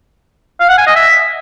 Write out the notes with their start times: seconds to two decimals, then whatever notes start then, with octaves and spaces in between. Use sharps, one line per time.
0.60 F5
0.69 F#5
0.78 G#5
0.87 D#5
0.95 E5